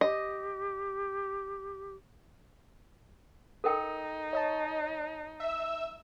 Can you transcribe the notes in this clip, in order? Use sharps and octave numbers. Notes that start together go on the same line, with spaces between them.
G4 D#5
D#4 A4 A#4 G5
C#5 D#5 A5
E5 E6